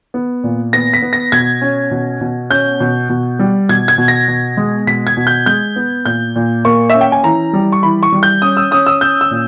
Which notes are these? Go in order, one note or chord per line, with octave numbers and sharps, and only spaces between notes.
B3
A#2
B3 A#6
B6
B3
A#6
B2 G#6
C#4
B2
B2
C#4 G6
B2
B2
G3
B2 G#6
G#6
B2
A#6
B2
G#3
B2 B6
G#6
B2
G6
G#3 G6
B3
A#2 G6
A#2
A#3 C#6
C#4 E5
G5
G#5
E3 A#5
G3
C#6
E3 B5
C#6
G3
G6
C#4 D#6
E6
C#4 D#6
E6
C#4 G6
E6
A#2